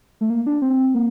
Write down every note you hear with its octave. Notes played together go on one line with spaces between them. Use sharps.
A3
A#3
D4
C4
A#3